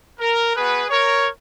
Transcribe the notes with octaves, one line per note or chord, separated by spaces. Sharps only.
A#4
B3 F#4 G#4 B4
A#4 C#5